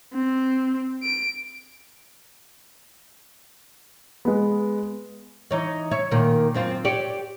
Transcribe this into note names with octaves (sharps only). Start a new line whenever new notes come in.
C4
D7
G#3 B3
E3 D#4 C#5
C#5 E5
A#2 D#3
F#2 C4 F4
G4 C#5 D5